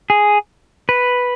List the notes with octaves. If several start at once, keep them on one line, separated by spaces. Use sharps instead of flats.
G#4
B4